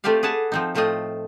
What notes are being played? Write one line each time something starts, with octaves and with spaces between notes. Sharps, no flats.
A3 C4 F4 G4 D5 F5
G#4 B4 F#5 G#5 A5
F3 C4 D#4
A2 A3 C4 F4 D#5